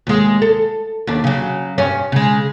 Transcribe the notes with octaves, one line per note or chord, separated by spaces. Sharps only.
D#2 G#3
A4
D#2 D4
C#3 F#3
G2 C#4
C#3 G#3